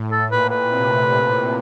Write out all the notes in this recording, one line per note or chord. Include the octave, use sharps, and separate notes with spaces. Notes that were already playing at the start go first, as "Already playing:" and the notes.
Already playing: A2
A4
A#2 B4
B4
C3
A#2